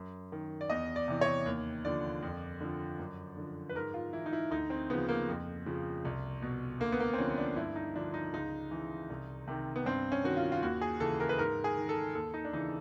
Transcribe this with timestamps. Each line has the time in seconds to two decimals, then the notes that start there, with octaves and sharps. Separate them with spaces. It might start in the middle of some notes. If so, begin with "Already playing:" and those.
Already playing: F#2
0.32 D#3
0.61 D5
0.70 E2 D#5
0.96 D5
1.08 C3 E3
1.21 C#5
1.46 D#2
1.85 D3 F3 D5
2.22 F2
2.61 D3 F3
2.99 F#2
3.37 D3 F3
3.69 B4
3.75 G#2 A#4
3.94 F4
4.13 E3 E4
4.26 D#4
4.33 E4
4.51 D2 D#4
4.70 C4
4.90 C#3 F3 B3
5.09 A#3
5.28 F2
5.66 C#3 F3
6.05 C2
6.42 B2
6.80 D2 A#3
6.92 B3
7.00 A#3
7.13 C4
7.18 D3 F3 C#4
7.38 D4
7.56 G2 E4
7.76 D#4
7.96 D3 F3 D4
8.14 D#4
8.33 C#2 D#4
8.71 C#3 E3
9.10 C2
9.47 C3 D#3
9.76 B3
9.85 G2 C4
10.12 C#4
10.24 D#3 F#4
10.37 F4
10.52 F4
10.62 D#2 F#4
10.81 G#4
11.00 C#3 E3 A4
11.20 A#4
11.29 B4
11.38 G#2 A#4
11.64 G#4
11.77 D#3
11.89 A4
12.15 D#2 A4
12.34 D#4
12.45 D4
12.53 C#3 E3 D#4